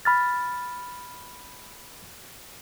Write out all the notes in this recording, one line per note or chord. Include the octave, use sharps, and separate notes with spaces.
B5 F6 A6